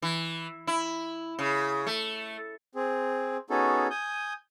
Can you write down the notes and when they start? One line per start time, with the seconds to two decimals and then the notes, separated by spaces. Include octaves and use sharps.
0.02 E3
0.67 E4
1.39 C#3
1.87 A3
2.75 C4 G#4
3.50 B3 C#4 D#4 F#4 G#4 A4
3.90 G#5 D#6 G6